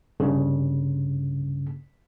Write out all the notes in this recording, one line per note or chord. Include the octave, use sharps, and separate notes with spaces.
C2 G2 C#3